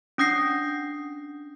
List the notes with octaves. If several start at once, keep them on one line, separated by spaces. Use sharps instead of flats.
C#4 D4 D#6 G6 A#6 C7